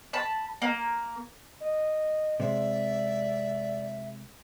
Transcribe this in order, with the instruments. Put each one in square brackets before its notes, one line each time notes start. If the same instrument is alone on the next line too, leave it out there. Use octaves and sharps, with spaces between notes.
[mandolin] A5 B5
A#3
[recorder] D#5
[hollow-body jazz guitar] C3 G#3 [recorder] D5 [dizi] E5